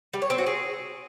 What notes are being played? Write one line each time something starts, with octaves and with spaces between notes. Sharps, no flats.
G3
C#5
C4
F#4
G#4